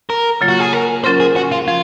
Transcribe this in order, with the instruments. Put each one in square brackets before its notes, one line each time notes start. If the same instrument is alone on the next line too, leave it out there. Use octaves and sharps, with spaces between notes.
[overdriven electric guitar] A#4
[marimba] C#3 F#3 A#3 F4
[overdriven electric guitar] F#4
G#4
A#4
[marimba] F#3 C#4 F4 A#4 [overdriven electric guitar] C5
[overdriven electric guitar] G#4
F#4
F4
[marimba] F3 [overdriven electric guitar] F4